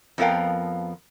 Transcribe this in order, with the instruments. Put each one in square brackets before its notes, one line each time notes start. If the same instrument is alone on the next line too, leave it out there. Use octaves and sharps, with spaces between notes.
[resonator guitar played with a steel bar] F2 F3 B3 A#4 F5 G5